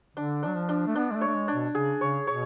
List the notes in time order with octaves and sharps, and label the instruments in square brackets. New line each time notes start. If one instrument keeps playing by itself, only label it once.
[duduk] D3 [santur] D4
[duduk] F#3 [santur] D4
[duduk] F3
[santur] D4
[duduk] A3
[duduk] B3 [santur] D4
[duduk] G#3
A3
[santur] C#5
[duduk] A3
G#3
[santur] D4
[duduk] B2
[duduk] C#3 [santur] G#4
[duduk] C#3 [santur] C#5
[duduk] B2 [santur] C#5